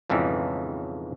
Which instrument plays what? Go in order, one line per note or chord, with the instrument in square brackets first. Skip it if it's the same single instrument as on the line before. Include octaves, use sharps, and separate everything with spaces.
[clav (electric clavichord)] B1 F2 G#2 C#3 E3